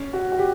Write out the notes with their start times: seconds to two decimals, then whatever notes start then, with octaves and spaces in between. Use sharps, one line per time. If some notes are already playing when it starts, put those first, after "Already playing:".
Already playing: C#4
0.13 F#4
0.32 F#4
0.38 G4